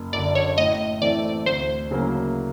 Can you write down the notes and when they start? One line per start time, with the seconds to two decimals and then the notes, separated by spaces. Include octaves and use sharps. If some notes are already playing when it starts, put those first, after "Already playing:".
Already playing: F#1
0.13 F#2 D3 D5
0.35 C#5
0.58 A2 D#5
1.02 E3 A3 C4 D5
1.46 D2 C5
1.91 C#3 F#3 A#3 C#4